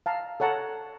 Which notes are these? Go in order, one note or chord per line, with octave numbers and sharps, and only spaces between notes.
F5 A5 A#5
A4 C#5 F#5 A5 A#5